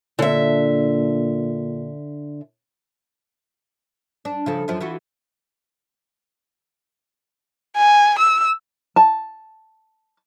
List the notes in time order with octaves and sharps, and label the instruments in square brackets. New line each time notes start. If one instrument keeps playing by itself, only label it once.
[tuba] A#2 [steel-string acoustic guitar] D3 E5
[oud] D4
C#3 F3 A4
F#2 F3
E3 F4 F#4
[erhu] G#5
E6
[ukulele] A5